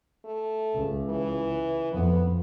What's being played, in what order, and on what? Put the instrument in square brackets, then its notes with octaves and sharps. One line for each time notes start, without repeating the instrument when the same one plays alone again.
[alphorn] A3
[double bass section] C#2
[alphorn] E3
[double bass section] F2 [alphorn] B3